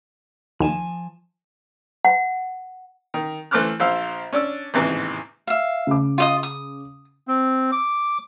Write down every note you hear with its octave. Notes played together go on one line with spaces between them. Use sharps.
D#2 F3 G#5 A5 E7
F#5
D#3
E3 A3 C5 D6 F6 F#6
A#1 F3 C5 F5 E6
C#4 D4 D5 E6
A1 D#2 G#2 C3 E3
E5 F5
C#3 D6
F4 D#5 D#6
D#6
C4
D6